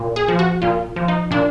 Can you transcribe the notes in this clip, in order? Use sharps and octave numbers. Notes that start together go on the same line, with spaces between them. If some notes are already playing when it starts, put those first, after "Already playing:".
Already playing: A#2
G#4
F3
F#4
A#2 F4
F3
D#4
A#2 D4